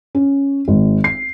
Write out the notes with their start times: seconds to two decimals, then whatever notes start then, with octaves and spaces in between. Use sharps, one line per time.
0.15 C#4
0.68 G#1
1.04 C7